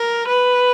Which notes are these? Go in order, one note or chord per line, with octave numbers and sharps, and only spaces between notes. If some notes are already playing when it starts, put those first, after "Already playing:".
Already playing: A#4
B4